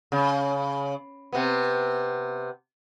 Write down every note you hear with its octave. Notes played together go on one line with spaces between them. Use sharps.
C#3
C3 B3